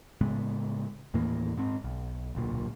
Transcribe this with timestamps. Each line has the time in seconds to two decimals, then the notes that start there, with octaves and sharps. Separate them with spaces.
0.21 A2 C#3 G#3 B3
1.14 D#2 A2 E3 A#3
1.57 G#2 C4
1.84 B1
2.35 D1 B1 A#2